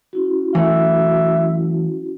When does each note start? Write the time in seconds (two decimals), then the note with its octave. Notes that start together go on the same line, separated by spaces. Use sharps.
0.13 C#4 E4 F#4
0.55 E3 F#3 A3 E5